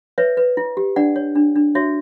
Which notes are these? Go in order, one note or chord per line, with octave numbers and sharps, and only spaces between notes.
B4 C#5 E5
B4
E4
G4
D4 D5 F#5
C#5
D4
D4
F#4 C#5 E5